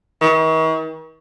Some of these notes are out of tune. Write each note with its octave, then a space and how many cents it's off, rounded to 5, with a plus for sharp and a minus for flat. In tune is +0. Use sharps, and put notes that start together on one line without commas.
D#3 +45